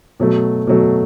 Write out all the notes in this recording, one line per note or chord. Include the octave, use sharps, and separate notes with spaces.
B2 F#3 A3
B2 F#3 A3